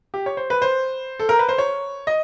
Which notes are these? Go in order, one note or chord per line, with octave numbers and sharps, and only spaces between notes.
G4
C#5
C5
B4
C5
A4
A#4
B4
C5
C#5
D#5